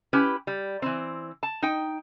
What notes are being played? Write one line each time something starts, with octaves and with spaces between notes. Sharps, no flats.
C#4 E4 G4 B4 G5
G3
E3 C4
A5
D#4 G5